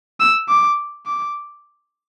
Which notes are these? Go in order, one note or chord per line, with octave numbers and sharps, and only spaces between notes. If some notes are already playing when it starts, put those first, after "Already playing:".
E6
D6
D6